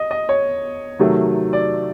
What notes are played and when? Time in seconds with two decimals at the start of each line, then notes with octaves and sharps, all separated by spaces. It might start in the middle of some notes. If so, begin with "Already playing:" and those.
Already playing: D#5
0.11 D#5
0.29 C#5
0.99 C3 D#3 F#3 A3
1.53 D5